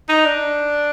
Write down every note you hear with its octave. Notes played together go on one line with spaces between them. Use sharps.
D#4
D4